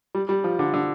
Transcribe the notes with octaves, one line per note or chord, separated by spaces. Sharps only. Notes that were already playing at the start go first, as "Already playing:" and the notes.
G3
G3
F3
D3
D3